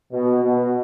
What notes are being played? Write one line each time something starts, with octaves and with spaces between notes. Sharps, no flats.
B2
B2